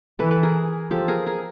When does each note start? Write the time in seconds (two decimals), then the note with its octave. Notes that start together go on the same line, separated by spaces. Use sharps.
0.19 E3 A4 B4
0.31 A4 B4
0.43 G#4 A#4
0.91 F3 G4 A4
1.08 G#4 A#4
1.26 G#4 A#4